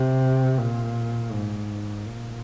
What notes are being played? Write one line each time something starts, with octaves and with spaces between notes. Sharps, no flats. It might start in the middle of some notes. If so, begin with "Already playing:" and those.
Already playing: C3
A#2
G#2
A#2